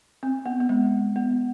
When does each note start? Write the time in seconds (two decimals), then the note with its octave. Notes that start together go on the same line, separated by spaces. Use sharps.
0.23 C4
0.46 B3
0.60 B3
0.69 G#3
1.16 B3